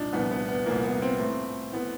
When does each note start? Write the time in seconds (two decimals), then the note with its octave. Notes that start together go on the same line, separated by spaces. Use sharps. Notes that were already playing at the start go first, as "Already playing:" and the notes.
Already playing: C2 A#2 F3 D4 D#4
0.13 C2 A#2 F3 B3
0.31 B3
0.48 B3
0.66 C2 A#2 F3 A#3
0.84 B3
1.02 C4
1.20 A2 E3 A3
1.73 A2 E3 A3 B3